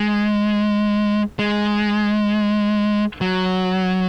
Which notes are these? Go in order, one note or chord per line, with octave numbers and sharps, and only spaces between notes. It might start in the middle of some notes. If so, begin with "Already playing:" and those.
Already playing: G#3
G#3
F#3